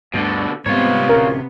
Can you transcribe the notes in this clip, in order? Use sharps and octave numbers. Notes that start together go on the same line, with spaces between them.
D2 G2 B2 D3 A3
G#2 C3 G3 B3 F4 C#5
D1 C#4 A#4